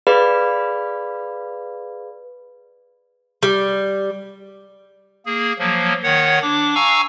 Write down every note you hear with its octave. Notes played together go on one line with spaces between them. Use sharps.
G#4 B4 D5 F5 B5
G3
A#3 G#4
F3 F#3 A#3
D#3 C#5 F#5
D4 D6
F5 G#5 A#5 C#6 E6